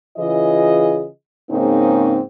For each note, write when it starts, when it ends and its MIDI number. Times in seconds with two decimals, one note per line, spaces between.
0.18 1.07 49
0.18 1.07 52
0.18 1.07 65
0.18 1.07 68
0.18 1.07 75
1.51 2.19 44
1.51 2.19 49
1.51 2.19 58
1.51 2.19 60
1.51 2.19 61
1.51 2.19 63